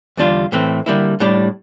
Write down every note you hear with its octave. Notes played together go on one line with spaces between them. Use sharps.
E2 D3 G3 D4 F4
A2 E3 A3 C4
D3 G3 A#3 E4
A2 G3 D4